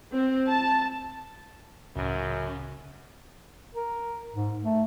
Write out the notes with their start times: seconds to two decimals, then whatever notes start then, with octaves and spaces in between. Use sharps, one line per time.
0.12 C4
0.49 A5
1.96 C#2 F#2 A2 C#3
3.75 A#4
4.34 G#2
4.63 A3